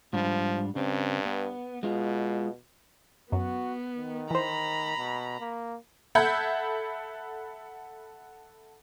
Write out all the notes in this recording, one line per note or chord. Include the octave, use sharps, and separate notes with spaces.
G#2 F3 G3 D4
G2 C#3 C4
B3
B2 G#3 F4
F#2 B3 F#4
D#3
E3 C5 A#5 B5
B2
A#3
A4 E5 F#5 B5 G6 G#6